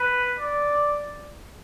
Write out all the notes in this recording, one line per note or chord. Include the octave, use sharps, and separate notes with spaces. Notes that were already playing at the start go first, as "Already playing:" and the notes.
Already playing: B4
D5